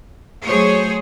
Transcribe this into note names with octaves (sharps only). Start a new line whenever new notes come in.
F#3 A3 G#4 C5 C#5